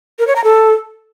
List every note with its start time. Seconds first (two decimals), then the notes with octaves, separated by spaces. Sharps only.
0.19 A#4
0.27 C#5
0.36 A#5
0.44 A4